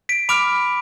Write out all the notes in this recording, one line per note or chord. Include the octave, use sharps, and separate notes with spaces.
B6 D7
B5 D6 F6 D7 F7